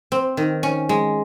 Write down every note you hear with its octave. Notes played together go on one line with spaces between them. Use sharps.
C4
D#3
C#4
G#3